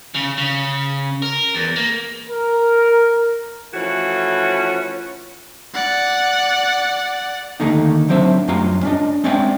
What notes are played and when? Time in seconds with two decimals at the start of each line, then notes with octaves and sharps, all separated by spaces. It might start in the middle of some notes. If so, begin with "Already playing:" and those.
0.15 C#3
0.38 C#3
1.22 A#4
1.55 E2
1.76 A#3
2.30 A#4
3.74 E3 F3 A3 C#4 E4 F#4
5.74 D5 F#5
7.60 D3 D#3 A3 A#3 D#4
8.09 F#3 C4 D4 C5 E5
8.48 F#2 G3 A3 F4 A#5 C6
8.83 C#4 D4 D#5
9.24 G#3 C4 C#4 D5 E5 G5